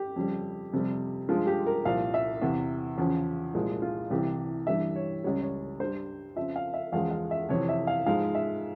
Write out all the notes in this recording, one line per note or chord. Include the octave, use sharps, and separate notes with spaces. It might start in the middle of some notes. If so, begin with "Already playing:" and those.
Already playing: G4
F2 C#3 G3
F2 C3 G3
G2 F3 G#3 F4
G4
A#4
C2 A#2 F3 F5
E5
E2 C3 E3
E2 C#3 F3
C2 A#2 F3 G#3
F4
C2 C3 E3 G4
G2 E3 G3 E5
C#5
C#2 C#3 G3 C#5
C#5
G2 G3 C5
F2 C#3 F3 E5
F5
E5
E2 C#3 F3 G#3 F5
F5
E5
F2 C3 E3 C#5
E5
F5
G#2 F3 G#3 F5
E5